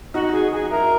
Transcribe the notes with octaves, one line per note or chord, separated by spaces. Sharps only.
D#4 F#4
F#4 G#4
F#4 G#4
E4 A#4